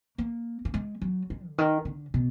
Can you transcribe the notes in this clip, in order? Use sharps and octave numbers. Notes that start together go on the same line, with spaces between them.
A#3
A#3
G#3
F#3
G#3
D3
D#3
D3
B2